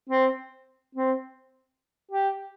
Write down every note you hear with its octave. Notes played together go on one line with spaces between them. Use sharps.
C4
C4
G4